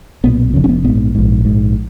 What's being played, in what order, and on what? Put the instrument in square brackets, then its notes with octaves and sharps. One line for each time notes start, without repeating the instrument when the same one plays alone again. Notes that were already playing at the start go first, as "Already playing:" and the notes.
[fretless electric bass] B1 A#2 B3
F1 F2 C#3
C#4
B3
A#1 G#2 B3
A#1 G#2
A#1 G#2